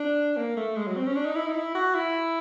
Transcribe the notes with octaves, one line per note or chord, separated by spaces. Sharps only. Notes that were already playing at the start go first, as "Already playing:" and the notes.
Already playing: D4
A#3
A3
G#3
F#3
C4
C#4
D4
D#4
E4
D#4
E4
F#4
E4